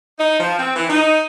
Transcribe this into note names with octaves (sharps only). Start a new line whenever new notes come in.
D#4
F3
C4
E3
D#4